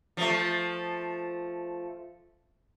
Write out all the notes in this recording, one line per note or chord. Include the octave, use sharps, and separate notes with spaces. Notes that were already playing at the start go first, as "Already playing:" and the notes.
F3 A3